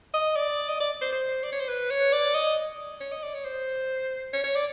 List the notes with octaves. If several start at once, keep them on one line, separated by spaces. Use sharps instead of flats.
D#5
D5
D#5
D5
C5
C5
D5
C#5
C5
B4
C#5
D5
D#5
C#5
D#5
D5
C#5
C5
C#5
C#5
D5